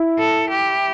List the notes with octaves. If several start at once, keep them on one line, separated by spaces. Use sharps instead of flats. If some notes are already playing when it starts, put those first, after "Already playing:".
Already playing: E4
A4
G4